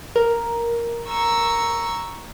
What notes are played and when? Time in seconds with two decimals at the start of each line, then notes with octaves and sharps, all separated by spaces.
0.16 A#4
1.09 A#5 C#6 E6